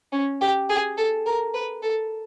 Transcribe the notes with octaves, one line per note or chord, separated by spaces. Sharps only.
C#4
G4
G#4
A4
A#4
B4
A4